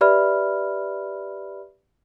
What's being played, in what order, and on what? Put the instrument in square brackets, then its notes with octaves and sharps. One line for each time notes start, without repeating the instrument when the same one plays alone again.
[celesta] G4 B4 D5 E5 B5 F6